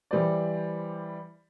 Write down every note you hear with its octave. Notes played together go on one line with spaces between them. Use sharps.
E3 G3 C5 D5